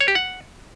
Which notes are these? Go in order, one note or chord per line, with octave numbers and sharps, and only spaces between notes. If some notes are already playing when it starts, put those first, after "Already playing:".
C#5
G4
F#5